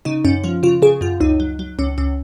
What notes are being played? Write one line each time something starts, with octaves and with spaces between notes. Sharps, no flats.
C#3 D#4
F#2 C#4
F3 F4
C#3 F4
C#3 G#4
F#2 F4
C#2 D#4
F#3
F#3
C#2 C#4
C#2 C#4